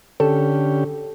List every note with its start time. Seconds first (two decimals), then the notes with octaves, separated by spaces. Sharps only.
0.20 D3 C#4 G4 A4